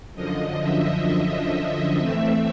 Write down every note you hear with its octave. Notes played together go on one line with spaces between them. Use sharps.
F#2 D3 F3 D#5
E5
D#5
A2 E3 A3 C4 E5